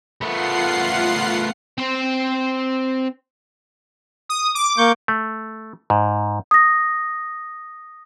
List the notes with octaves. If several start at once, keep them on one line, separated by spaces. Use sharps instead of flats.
A3 B3 F4 F#5 C7
C4 C5
D#6
D6
A#3 C#6 G6
A3
G#2
D#6 A#6